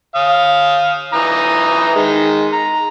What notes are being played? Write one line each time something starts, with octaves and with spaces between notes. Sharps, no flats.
F5 D#6
E3 A#5 D#6
D#3 G#3
A#5